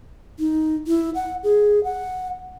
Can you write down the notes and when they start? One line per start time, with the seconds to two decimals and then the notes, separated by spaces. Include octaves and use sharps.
0.39 D#4
0.87 E4
1.15 F#5
1.44 G#4
1.84 F#5